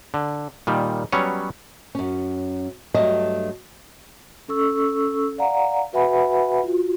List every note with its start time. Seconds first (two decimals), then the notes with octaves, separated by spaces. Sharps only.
0.14 D3
0.67 A#2 D#3 G3
1.12 F#3 G3 B3 C#4 C#5
1.95 F#2 C#4
2.94 G2 F#3 G3 A3 D#5
4.48 C#4 A4 C#6 E6
5.38 D5 F5 F#5 A#5
5.93 F#4 B4 E5 F#5 G#5 B5
6.63 F4 F#4